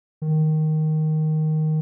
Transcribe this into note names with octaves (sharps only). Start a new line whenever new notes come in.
D#3